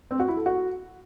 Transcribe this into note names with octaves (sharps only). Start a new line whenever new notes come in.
C4
F#4
E4
A4
F#4